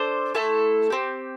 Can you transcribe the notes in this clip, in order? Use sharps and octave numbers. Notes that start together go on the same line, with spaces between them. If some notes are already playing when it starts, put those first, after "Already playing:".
Already playing: D4 A4 C5 C6
A3 E4 A4
C4 G4